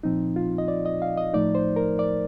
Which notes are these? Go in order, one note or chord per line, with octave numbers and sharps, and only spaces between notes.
A#2 F3 C4 D#4
F4
D#5
D5
D#5
F5
D#5
A2 F3 A3 D#4 D5
C5
A#4
D5